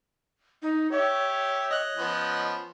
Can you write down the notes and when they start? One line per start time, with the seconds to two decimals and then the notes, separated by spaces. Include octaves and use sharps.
0.62 D#4
0.91 G4 C#5 E5
1.71 D#5 F#6
1.98 F3 B3 C#4